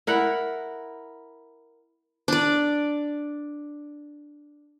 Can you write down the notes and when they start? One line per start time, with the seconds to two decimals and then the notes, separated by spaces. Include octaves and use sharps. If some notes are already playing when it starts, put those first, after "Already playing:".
0.07 E4 A#4 F#5
2.28 D4 D5